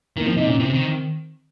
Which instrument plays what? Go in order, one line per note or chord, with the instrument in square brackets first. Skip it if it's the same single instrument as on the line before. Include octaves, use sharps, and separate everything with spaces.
[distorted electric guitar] D#3 [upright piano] A#3
[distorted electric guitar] F3 [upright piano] C4
[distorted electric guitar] C3 [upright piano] D#4
[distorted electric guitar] A#2 [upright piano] C#4
[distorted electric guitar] C3 [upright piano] C4
[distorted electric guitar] D#3